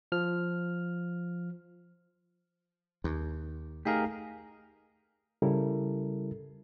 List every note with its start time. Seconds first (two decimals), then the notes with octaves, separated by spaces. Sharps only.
0.12 F3 F6
3.04 D#2
3.85 A3 D#4 G4 G#4 A#4 F5
5.42 C#3 G3 E4 A4 A#4